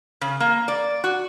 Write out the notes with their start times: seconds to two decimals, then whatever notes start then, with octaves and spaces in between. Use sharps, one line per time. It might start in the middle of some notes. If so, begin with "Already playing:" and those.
0.21 C#3
0.40 A#3
0.68 D5
1.04 F#4